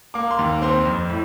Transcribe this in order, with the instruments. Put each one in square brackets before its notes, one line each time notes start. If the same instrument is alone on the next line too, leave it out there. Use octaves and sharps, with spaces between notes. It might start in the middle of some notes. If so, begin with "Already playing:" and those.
[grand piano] A#3 D6
C6
D#2
C4 C6
F2
A2